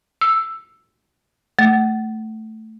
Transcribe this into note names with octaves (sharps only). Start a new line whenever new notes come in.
E6
A3